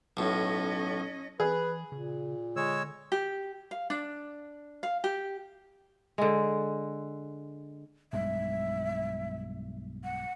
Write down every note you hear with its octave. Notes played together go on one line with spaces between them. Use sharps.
B1 A2 C#4 D#5
E3 G#4 B4
A#2 C#3
D3 G#3 C#5 E6
G4
F5
D4
F5
G4
D3 G#3
B1 G2 G#3 E5
F#5